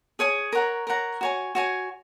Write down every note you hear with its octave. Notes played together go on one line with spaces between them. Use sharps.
G#4 C#5 G#5 D#6
A#4 C#5 F#5 A#5
A#4 C#5 F#5 A#5
F#4 C#5 G#5
F#4 C#5 G#5